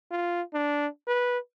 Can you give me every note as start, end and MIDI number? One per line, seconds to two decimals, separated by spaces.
0.11 0.42 65
0.54 0.87 62
1.08 1.38 71